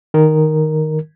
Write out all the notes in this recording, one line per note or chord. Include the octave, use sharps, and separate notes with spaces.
D#3 A#4